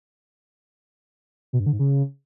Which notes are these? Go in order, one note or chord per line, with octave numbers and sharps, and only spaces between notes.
B2
G2
D3
G#2
C#3